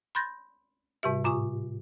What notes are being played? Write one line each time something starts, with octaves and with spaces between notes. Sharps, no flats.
B5 C6 F#6 G6 A6 A#6
G#2 C3 G3 G4 E5
A2 F4 G#5 C#6 D#6